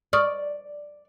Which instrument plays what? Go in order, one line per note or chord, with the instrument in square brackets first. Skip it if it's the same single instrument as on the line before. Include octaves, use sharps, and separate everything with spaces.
[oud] D5 [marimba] C#6 D#6 F6